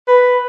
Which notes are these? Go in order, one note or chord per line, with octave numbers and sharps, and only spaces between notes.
B4